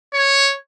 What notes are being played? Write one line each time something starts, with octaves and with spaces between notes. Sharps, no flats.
C#5